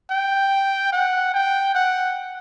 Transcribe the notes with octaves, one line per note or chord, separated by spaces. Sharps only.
G5
F#5
G5
F#5